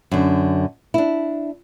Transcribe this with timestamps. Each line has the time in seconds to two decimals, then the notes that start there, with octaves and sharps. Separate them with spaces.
0.12 F#2 D3
0.94 D4 E4